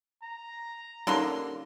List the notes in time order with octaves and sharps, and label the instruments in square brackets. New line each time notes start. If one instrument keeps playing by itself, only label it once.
[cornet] A#5
[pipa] D3 A#3 C6 [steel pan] G3 C#4 D#4